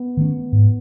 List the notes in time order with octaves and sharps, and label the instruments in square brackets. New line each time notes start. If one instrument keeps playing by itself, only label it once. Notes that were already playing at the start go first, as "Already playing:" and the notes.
Already playing: [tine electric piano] B3
[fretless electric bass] D#3 A3 C#4
G#2